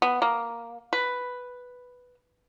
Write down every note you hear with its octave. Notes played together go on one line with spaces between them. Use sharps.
B3
A#3
B4